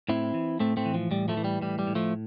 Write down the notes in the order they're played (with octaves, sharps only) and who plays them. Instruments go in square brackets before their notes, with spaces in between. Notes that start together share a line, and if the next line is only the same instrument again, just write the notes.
[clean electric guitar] A2 C4 E4
E3
A2 A3 C4
A3 C4
E3
F3
A2 G3
F3 A3
E3
G3
A2 G3
G3
A2
F3 A3